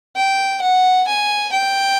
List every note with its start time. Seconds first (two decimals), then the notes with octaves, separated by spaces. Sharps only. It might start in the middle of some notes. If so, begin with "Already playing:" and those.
0.16 G5
0.62 F#5
1.08 G#5
1.52 G5